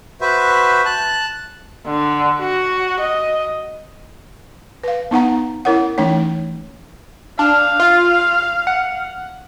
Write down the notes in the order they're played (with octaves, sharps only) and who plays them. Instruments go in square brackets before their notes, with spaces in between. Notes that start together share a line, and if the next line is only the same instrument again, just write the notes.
[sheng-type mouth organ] F#4 B4 C5 E5
A5 F#6
[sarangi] D3
F#4
D#5
[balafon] B4 F5
B3 D#4 F#5 A#5
C#4 E4 A#4 C#5 F#5
E3 A3 C#4 D#4 C#5
[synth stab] D4 [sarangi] F5
[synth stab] F4
F#5